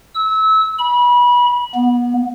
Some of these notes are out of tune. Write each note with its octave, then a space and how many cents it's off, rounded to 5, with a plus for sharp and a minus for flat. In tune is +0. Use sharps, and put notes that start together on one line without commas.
E6 -25
B5 -25
B3 -25